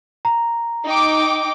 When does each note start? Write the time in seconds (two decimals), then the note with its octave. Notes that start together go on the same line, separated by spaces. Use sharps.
0.25 A#5
0.86 D#4 G5 D6